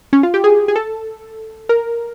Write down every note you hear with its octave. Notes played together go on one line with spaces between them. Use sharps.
C#4
F4
G4
G#4
G#4
A4
A#4